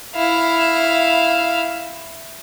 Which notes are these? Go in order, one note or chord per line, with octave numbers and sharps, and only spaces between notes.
E4 F5